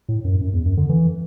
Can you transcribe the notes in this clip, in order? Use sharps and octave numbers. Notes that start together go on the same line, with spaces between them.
A2
F#2
F#2
E2
F#2
D3
E3